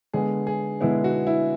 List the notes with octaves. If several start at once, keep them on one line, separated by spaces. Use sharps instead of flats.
D3 G#3 B3 G#4
G#4
D3 G#3 B3 E4
F#4
E4